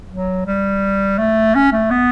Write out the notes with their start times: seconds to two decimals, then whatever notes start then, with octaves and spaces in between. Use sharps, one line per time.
0.10 F#3
0.46 G3
1.18 A3
1.55 C#4
1.73 A3
1.91 B3